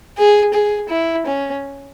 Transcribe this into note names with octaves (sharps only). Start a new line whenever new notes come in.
G#4
G#4
E4
C#4